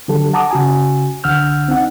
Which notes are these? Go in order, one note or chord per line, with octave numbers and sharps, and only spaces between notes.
D3 F#3 G4 A4
F#5 A5 A#5 D6 D#6
C#3 F#4 G#5
C2 D3 F#5 E6 F6 G6
C4 D#4 F#5